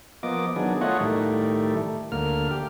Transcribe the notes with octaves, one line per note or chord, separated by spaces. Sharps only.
F3 A#3 B3 D#5 D6
D#3 F#3 B3 D4 G#4
A3 F4 C#5 D#5 F#5
A2 D#3 G3 A3
D2 A#3 F6
G4